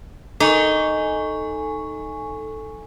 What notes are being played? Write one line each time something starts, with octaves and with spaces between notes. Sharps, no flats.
D#4 A4 G#5 C#6